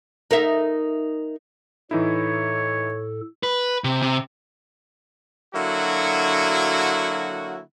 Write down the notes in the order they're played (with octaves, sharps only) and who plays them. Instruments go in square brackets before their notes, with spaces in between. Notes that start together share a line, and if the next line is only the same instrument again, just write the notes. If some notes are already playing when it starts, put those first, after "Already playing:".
[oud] D#4 A#4 E5
[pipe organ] A2 A4 [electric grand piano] E3 D#4 E4 [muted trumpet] C#5
[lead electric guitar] B4
C3
C3
[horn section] D3 F#3 A#3 E4 F#4